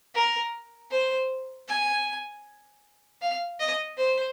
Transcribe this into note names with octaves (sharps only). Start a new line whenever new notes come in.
A#4
C5
G#5
F5
D#5
C5